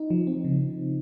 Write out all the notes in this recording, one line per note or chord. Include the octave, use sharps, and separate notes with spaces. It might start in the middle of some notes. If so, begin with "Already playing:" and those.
Already playing: D#4
F3
C4
C#3